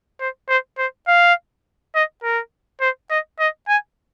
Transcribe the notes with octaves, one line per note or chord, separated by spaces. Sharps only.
C5
C5
C5
F5
D#5
A#4
C5
D#5
D#5
G#5